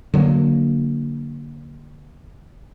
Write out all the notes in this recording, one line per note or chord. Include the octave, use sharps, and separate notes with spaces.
D3 F#3 A3 A#3